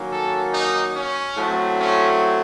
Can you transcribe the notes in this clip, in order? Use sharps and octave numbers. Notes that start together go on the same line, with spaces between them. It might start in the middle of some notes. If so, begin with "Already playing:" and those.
Already playing: D#3 F#3 A#3 C#4
A4
D#4
C#4
A2 F#3 A3 C4
C#4